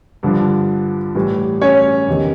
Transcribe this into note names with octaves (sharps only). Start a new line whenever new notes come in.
G2 D3 F3
A2 E3 G3
C#4 C#5
E2 C3 D#3